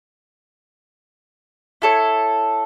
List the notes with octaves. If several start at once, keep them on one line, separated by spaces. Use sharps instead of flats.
E4 A4 C#5